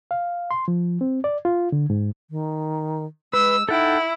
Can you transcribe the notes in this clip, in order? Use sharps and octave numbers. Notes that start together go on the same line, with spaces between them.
F5
C6
F3
C4
D5
F4
D3
G#2
D#3
G#3 B4 E6
D#4 E4 A4 F#5 G5